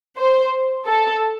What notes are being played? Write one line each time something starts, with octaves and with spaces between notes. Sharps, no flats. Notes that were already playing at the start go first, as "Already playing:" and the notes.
C5
A4